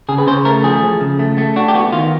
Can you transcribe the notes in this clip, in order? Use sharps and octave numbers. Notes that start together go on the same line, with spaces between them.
C#3 G#4
B4
C#3 C5
A3 A#4
F3 G#4
F3
C#3
A3
A3
D4 F#4
G4
B3 F#4
D#3 F4